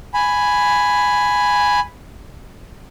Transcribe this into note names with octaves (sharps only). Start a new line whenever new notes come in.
G#5 B5